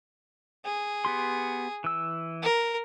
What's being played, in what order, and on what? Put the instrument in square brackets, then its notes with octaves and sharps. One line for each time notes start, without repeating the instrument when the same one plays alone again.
[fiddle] G#4
[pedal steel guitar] B3 G4 C6
E3 E6
[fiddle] A#4